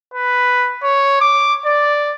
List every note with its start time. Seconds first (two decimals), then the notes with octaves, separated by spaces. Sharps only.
0.14 B4
0.83 C#5
1.21 D6
1.66 D5